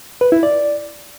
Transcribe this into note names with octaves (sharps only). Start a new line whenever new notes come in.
B4
E4
D5